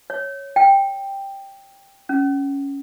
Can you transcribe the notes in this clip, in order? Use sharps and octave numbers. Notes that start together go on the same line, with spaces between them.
C#5
G5
C#4